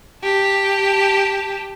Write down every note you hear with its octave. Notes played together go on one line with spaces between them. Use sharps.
G4 A5